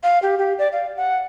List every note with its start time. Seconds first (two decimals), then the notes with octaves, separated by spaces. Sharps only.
0.03 F5
0.23 G4
0.38 G4
0.59 D5
0.72 F5
0.97 F#5